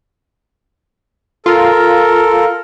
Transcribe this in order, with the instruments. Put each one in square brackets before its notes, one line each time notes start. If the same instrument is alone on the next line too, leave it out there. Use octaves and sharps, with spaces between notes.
[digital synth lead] F4 [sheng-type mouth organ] A4 A#4